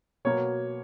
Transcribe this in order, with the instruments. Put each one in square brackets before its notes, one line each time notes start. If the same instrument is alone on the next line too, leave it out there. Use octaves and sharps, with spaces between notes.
[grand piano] B2 F#3 A#3 C#5